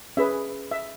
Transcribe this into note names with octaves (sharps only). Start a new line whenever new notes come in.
C#4 G#4 B4 E5
E5